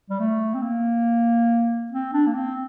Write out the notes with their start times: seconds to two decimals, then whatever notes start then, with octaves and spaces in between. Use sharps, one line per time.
0.10 G3
0.19 A3
0.54 C4
0.62 A#3
1.92 C4
2.13 D4
2.27 A#3
2.35 C4